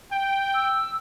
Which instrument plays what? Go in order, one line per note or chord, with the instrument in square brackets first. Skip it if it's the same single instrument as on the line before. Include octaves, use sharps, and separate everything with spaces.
[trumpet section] G5
[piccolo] E6